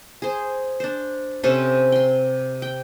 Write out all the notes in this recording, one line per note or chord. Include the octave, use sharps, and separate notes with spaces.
G#4 C5
D4 C5
C3 C#4 A4 C5
G5 C6
G5